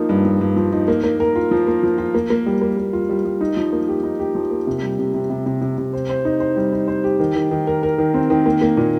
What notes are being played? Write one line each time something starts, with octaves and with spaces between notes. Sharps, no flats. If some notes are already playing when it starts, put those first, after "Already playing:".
Already playing: F3 A#3 D#4
G2
F3
G2
F3
D#4
A#3
A#3
A#4
F4
F3
A#3
F3
F4
A#3
A#3
G3
A#3
A#3
F4
G3
G3
D#4
F3
A#3
G4
D#4
G4
F3
A#3
C3
G3
C3
C3
C3
C3
C3
C3
C5
C5
D#4
C5
G3
D#4
C5
G4
D#3
D#3
D#3
A#4
A#4
D#3
C4
D#3
A#3
A#3
A#2